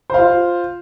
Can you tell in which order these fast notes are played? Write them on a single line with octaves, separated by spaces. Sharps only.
C5 F5 F4